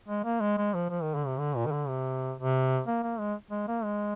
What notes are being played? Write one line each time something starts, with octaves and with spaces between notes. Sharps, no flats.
G#3
A#3
G#3
G#3
F3
F3
D#3
D3
C3
D3
A#2
D#3
D3
C3
C3
A#3
A#3
G#3
G#3
A#3
G#3